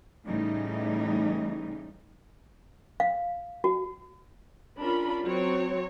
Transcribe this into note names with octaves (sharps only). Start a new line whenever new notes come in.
A2 C#3 E3 G3 D#4
F5
F#4
C#4 D4 F4 A#4 B5
F#3 C4 C#5